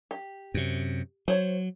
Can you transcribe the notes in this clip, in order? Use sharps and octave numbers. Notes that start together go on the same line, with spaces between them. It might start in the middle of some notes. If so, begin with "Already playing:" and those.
G4
F#2 C3
F#3 C5 C#5